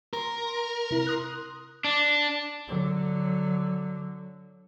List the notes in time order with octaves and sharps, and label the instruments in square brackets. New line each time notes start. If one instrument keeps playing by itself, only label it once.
[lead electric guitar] A#4 [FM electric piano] A#5 C6
[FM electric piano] C3 E4
C6 D#6 F#6
[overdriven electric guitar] D4
[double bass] D3 F#3